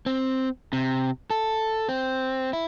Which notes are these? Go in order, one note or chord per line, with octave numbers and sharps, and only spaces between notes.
C4
C3
A4
C4
E4